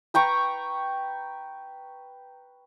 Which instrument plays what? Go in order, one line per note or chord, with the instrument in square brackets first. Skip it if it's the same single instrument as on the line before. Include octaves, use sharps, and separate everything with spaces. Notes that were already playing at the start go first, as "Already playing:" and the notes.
[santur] B4 G5 A#5 C#6